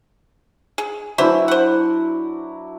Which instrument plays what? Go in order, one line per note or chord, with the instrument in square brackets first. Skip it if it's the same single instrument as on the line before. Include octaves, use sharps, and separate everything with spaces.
[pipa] G#4
[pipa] E3 C5 E5 [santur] F#3 D4 E4
[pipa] C5 F#5